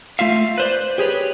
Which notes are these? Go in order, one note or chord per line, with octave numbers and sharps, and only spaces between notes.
A3 F4 E5 F5
B4 C5 D5
G4 G#4 B4 C#5